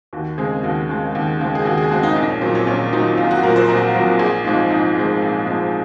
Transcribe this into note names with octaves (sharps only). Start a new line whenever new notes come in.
D#2 F#4
C#3 G#3 C4 G#4
D#2 F#4
C#3 G#3 C4
D#2
C#3 G#3 C4
G#4
D#2 F#4
G#4
C#3 G#3 C4 F#4
D#4
A#1 D#4
C#4
A#2 F#3 C4
C#4
A#1 C#4
A#2 F#3 C4 D#4
A#1 F4
F#4
A#2 F#3 C4 A#4
C5
A#1 A#4
A#2 F#3 C4 A#4
A#1 G#4
G#2 F3 G#3 C4 F4
A#1 D#4
G#2 F3 G#3 C4
A#1
G#2 F3 G#3 C4